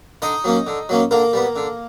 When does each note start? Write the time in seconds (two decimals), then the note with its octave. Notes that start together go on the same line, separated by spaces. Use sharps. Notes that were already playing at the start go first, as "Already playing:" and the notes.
0.22 D3 D#4 D#5
0.44 F#3 A#3 C#4
0.67 D3
0.89 F#3 A#3 C#4
1.11 D3 A#3 A#4
1.33 G3 B3
1.56 D3